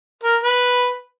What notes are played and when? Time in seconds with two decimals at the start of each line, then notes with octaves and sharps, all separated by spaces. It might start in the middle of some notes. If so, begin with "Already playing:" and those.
0.23 A#4
0.43 B4